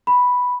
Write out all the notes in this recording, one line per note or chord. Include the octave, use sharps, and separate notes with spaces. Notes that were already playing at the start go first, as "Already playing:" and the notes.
B5